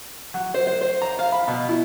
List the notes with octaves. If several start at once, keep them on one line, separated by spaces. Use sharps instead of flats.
F#3
C5
C5
C5
A#5
F5
B5
B2
E4